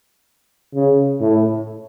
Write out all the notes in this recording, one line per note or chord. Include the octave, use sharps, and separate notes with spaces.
C#3
A2